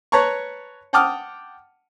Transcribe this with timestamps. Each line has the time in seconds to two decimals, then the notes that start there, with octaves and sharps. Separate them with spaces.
0.12 B4 C#5 A5 A#5 C#6
0.93 F#5 G5 A5 D6 D#6 F6